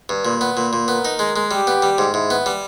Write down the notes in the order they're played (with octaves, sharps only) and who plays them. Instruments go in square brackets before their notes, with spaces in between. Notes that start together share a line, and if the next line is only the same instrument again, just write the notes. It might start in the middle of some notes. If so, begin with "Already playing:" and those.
[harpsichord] G2
[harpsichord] A#2 [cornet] B4
[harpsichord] B3
A#2
A#2
[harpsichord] B3 [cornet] A#4
[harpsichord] D#4
G#3
G#3
[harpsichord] G3 [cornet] G4
[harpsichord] B3
G3
G#2
[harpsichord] G#2 [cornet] E4
[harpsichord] B3
G3